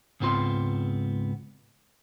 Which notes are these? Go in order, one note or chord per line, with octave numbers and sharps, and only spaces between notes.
C#2 G#2 B3 C4 F4 C6